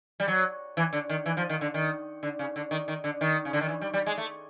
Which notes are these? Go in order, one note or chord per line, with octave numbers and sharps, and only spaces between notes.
G3
F#3
E3
D3
D#3
E3
F3
D#3
D3
D#3
D3
C#3
D3
D#3
D#3
D3
D#3
C#3
D3
D#3
E3
G3
G3
G#3
A3